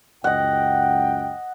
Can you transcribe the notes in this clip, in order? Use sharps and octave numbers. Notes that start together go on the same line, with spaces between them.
C#2 F#2 D#5 F#5 G5